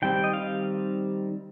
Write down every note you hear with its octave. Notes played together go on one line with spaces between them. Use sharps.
D#3 G3 C4 G5
D#5
F5